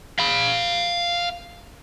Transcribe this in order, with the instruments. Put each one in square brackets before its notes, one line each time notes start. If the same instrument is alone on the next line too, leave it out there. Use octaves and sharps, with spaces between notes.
[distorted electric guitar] F5 B5